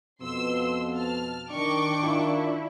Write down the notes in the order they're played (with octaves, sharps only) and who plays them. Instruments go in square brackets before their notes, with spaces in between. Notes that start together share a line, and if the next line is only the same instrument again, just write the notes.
[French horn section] F2 B2 [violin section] C6 E6
[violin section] A5 F6
[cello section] D#3 [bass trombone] D4 [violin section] G5 C#6 D6
[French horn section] D#3 F4 [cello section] E4